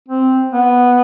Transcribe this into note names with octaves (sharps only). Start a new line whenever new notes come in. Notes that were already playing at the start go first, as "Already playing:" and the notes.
C4
B3